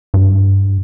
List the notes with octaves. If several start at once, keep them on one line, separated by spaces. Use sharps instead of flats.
G2